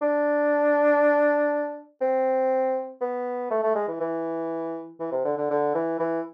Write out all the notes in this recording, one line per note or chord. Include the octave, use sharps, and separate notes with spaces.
D4
C4
B3
A3
A3
G#3
E3
E3
E3
C3
D3
D3
D3
E3
E3